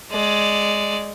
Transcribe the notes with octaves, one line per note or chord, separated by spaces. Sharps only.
G#3 D5